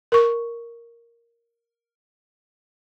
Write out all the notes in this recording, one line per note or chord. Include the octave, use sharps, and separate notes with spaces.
A#4 C#6